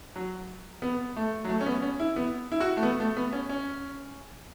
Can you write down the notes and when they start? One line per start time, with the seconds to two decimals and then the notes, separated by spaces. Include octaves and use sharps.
0.16 F#3
0.82 B3
1.17 A3
1.45 F#3
1.49 A3
1.61 C#4
1.66 B3
1.82 C#4
2.00 E4
2.16 B3
2.52 E4
2.60 F#4
2.77 A3
2.83 B3
3.00 A3
3.17 B3
3.32 C#4
3.49 C#4